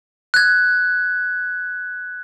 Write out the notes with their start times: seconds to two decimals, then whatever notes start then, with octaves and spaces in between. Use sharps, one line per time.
0.34 F#6 G#6